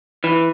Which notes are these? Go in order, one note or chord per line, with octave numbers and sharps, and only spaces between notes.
E3